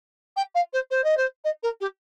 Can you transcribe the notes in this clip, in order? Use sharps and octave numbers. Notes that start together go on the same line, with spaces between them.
G5
F5
C5
C5
D#5
C5
D#5
A#4
G4